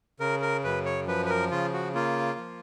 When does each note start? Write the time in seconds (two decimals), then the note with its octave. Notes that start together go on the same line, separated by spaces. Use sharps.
0.20 C#3 A#4
0.42 A#4
0.64 F#2 B4
0.85 C#5
1.07 F3 B4
1.26 B4
1.29 A#4
1.51 C#3 F4
1.73 F#4
1.95 A#3 F4
2.38 F3